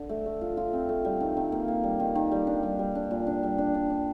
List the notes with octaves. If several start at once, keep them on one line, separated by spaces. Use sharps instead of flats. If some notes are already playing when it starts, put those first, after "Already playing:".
Already playing: D3
A3
A3
F4
F4
C4
A3
G3
D#3
D#3
A#3
A#3
G3
D#3
D#3
G3
D4
G3
G3
D4
A#2
D4
G3
D4
D4
D4